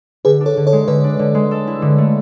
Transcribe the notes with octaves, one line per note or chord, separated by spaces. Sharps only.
D3 G#4 B4
D4
A4 C#5
D3
A4 C#5
G#3
D3 B4 D5
D4
D3
G#3
A4
E4
D3
A3